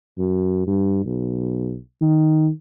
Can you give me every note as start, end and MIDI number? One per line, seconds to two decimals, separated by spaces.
0.18 0.64 42
0.67 1.05 43
1.05 1.77 35
2.01 2.49 51